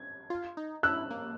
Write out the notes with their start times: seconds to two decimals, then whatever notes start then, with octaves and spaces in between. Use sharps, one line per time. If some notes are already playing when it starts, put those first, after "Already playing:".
Already playing: G#6
0.30 F4
0.57 D#4
0.83 E4 E6 F#6
1.11 A#3